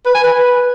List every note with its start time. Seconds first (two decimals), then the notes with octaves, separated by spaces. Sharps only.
0.06 B4
0.15 G#5
0.24 B4